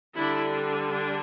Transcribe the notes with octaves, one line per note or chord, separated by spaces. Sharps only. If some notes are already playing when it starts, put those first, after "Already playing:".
D3 G3 D4 E4
D4